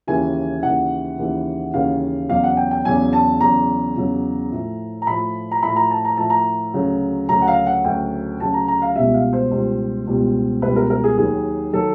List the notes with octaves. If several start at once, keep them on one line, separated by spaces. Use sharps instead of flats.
D#2 C#3 E3 G#5
D#2 C#3 E3 F#5
D#2 C#3 E3
D#2 C#3 E3 F5
E2 C#3 F#3 F5
F#5
G5
G5
E2 C#3 F#3 G#5
A5
E2 C#3 F#3 A#5
E2 C#3 F#3
A2 F3
A#5
A2 F3 B5
A#5
A2 F3 B5
A#5
A5
A#5
A2 F3 A5
A#5
D2 C#3 F#3
D2 C#3 F#3 A#5
F#5
F5
F#5
D2 C#3 F#3 G5
D2 C#3 F#3 A5
A#5
A#5
F5
C#2 B2 G3 E5
F5
C5
C#2 B2 G3
C#2 B2 G3
C#2 B2 G3 B4
A#4
A#4
G#4
D#2 D#3 F#3 G#4
D#3 F#3 A4